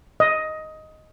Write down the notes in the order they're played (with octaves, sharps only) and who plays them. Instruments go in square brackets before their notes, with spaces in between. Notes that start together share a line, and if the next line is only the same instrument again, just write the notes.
[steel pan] D#5